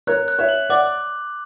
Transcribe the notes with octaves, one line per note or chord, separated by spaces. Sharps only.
A#4 C#5 F#6
F#6
C#5 E5
F#7
D5 F#5 D6